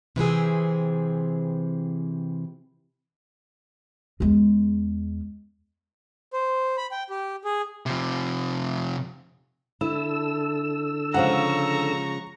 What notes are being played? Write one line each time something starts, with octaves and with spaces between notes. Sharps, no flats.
C3 E3 C4 G#4
E2 G#3
C5
B5
G5
G4
G#4
C3 F3
D3 E4 A4 E6
C#3 F3 G#3 F#5 A#5 C#6